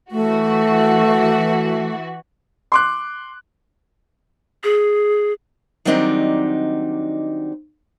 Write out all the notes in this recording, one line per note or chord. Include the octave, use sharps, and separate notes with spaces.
E3 A3 F#4
C6 D6 F#6
G#4
D#3 F#3 G3 C4 D4 D#4